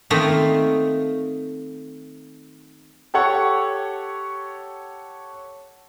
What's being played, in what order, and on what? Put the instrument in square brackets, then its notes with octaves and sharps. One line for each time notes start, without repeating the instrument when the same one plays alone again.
[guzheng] D#3 A3 A#3 C4 D#4
[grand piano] G4 A4 C#5 F#5 C#6